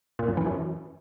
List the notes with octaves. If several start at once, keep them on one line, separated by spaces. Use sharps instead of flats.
A#2
F#2
E3
F#2